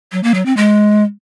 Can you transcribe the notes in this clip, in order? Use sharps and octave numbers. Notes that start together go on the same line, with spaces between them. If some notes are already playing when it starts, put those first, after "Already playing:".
F#3
A#3
F#3
C4
G#3